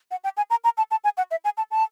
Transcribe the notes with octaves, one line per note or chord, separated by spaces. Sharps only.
F#5
G5
G#5
A#5
A#5
A5
A5
G#5
F#5
E5
G#5
A5
A5